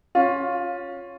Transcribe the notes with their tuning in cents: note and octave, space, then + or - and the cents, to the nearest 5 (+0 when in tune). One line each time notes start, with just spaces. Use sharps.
C#4 +0 F4 +10